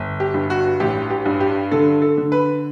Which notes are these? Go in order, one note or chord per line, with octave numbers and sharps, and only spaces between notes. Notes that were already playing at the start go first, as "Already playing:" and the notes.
Already playing: G1
G4
G2
F#4
A1 G4
G4
G2
G4
D3 A4
A4
D3
B4